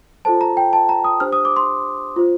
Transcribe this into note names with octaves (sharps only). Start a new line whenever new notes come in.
F4 A4 C5 A5
A#5
G5
A5
A#5
D#6
D4 G4 C5 F6
D#6
D6
C6
F4 C5